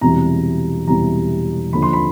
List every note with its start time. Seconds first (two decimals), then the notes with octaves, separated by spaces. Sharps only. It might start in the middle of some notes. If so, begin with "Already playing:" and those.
0.01 E1 E2 C3 E3 G3 A#5
0.87 E1 E2 C3 E3 G3 A#5
1.72 D#2 D3 F3 B5
1.82 C6
1.93 B5